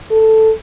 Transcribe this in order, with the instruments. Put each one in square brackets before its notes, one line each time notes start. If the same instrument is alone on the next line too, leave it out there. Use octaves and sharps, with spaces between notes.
[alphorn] A4